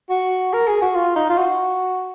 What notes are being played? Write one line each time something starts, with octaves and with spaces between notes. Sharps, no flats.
F#4
A#4
G#4
F#4
F4
D#4
F4
F#4